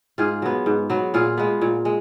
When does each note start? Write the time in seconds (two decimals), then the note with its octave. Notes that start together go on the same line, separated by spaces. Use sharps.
0.18 G#2 F4 G#4
0.42 F#3 B3
0.66 G#2
0.90 F#3 B3
1.14 A#2 F4 G#4
1.37 G#3 B3
1.61 A#2
1.85 G#3